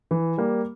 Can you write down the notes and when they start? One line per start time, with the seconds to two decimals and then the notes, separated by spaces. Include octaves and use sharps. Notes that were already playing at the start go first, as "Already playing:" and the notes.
0.11 E3
0.38 G3 A#3